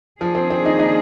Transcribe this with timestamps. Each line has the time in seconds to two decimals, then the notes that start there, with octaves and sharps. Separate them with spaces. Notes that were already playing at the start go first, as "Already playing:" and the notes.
0.21 D#3 F3 A#3 D4 G#4
0.35 C4
0.50 C4
0.66 D#4
0.79 D#4